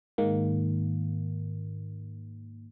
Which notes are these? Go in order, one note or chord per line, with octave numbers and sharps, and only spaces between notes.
G#2 D#3 A#3